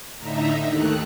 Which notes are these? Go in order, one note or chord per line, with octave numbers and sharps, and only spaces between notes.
A2 D3 D#4 E5 A#5
D#2 D#3 A3 F#6